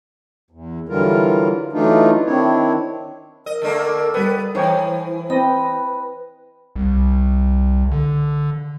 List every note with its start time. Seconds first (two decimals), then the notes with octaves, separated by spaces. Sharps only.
0.51 E2
0.89 D3 E3 F#3 G3 F4 A#4
1.73 E3 F#3 A3 D4 D#4 F4
2.26 D#3 C4 D4 E4 C#5
3.46 A#4 D#5
3.62 D3 A3 A#3
4.14 G3 B3 B4
4.55 E3 D#4 E4 C5 C#5 G5
5.30 C4 B4 D#5 B5
6.76 C2
7.91 D3